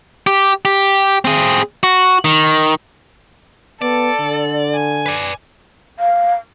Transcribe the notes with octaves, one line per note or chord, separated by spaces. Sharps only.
G4
G4
C4 G#4
F#4
D#3
B3 A4 D5
D3
G#5
B4 D5
F5